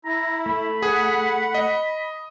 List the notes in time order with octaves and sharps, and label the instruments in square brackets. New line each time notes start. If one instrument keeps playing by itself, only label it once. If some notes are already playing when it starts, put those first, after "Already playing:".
[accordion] E4 [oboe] A#5
[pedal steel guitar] A3 [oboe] B5
[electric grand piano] G#4 [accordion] F#5
[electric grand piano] D#5